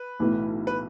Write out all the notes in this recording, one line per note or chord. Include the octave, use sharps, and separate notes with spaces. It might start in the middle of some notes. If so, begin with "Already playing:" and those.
Already playing: B4
B1 A2 E3 A3
B4